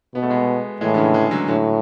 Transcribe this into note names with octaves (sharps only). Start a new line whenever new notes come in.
B2 B3
A3
G#3 B3
A2 E3 G#3
D3
C#3 E3
E3 G#3
D3 F#3
A2 D3 F#3